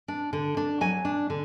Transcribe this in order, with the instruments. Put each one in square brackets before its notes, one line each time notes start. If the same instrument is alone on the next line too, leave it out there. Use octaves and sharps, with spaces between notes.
[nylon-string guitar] D4
D3
D4
F#3 G#5
D4
D3